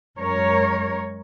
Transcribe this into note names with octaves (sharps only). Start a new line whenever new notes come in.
F#2 G#3 A#4 C#5